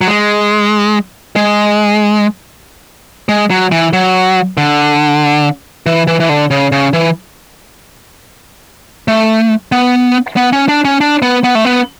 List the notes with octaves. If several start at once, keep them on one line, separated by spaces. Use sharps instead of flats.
F#3
G#3
G#3
G#3
F#3
E3
F#3
D3
E3
E3
E3
D3
C#3
C#3
E3
A3
B3
B3
C#4
D4
C#4
D4
B3
B3
A3
B3